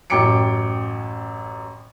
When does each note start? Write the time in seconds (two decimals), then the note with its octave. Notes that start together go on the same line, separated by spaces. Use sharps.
0.10 A1 F#2 G5 D6 C#7 D7